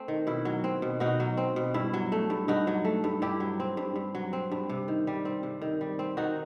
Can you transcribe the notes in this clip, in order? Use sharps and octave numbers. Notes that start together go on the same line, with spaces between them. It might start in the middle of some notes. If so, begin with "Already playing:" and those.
Already playing: A3 C4
D#3
B2 E4
F#3
C4
B2
B2 D#4 F#4
F#3
C4
B2
G2 E4
F#3
A3
G2
G2 D#4 F#4
F#3
A3
G2
G2 E4 G4
F#3
C4
G2
G2
F#3
C4
G2
C3
D#3
G3
C4
C3
D#3
G3
C4
D#3 D#4 F#4